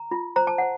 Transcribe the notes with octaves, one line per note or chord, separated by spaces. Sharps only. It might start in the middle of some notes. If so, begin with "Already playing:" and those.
Already playing: A#5
F4
C5 A#5
A5
C5 F#5